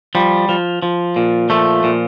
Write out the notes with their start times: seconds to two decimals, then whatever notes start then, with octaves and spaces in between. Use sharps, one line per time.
0.15 F3 G3
0.49 F3
0.83 F3
1.16 A#2
1.50 F3 A3
1.84 A#2